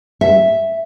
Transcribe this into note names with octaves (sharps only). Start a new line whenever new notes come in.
E5